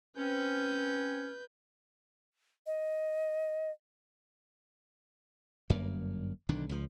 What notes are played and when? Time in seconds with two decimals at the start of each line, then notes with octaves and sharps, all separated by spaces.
0.17 C4 C#4 B4 G6
2.66 D#5
5.70 G1 F#2 A#3
6.49 B1 D3 D#3 D4
6.69 C#2 F3